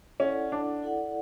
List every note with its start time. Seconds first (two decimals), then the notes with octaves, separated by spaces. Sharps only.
0.19 C#4 E4 A4 D5 F#5
0.52 D4
0.83 E4 A4 D5 F#5